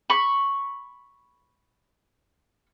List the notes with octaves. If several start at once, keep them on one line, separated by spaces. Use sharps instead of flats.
B5 C#6